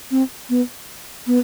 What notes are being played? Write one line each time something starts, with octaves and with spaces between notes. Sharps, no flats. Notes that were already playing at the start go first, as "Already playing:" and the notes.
C4
B3
B3